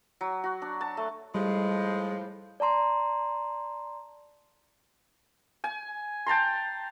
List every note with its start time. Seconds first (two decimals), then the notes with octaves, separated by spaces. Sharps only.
0.21 F#3
0.44 F#4
0.62 D4
0.81 A5
0.97 A3
1.35 A2 F3 G3 G#3
2.60 D5 A5 A#5 C6
5.64 G#5
6.26 G5 A5 A#5 C6